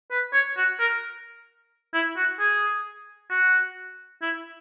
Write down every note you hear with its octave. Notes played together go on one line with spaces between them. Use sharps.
B4
C#5
F#4
A#4
E4
F#4
G#4
F#4
E4